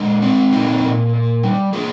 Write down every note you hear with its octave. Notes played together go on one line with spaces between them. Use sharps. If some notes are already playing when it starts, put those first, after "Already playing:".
Already playing: A#2 G#3
C4
A#2 D#4 G4
A#2
A#3
G3
A#3 F4 G#4